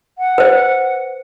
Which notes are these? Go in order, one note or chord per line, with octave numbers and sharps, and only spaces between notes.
F#5
B4 C5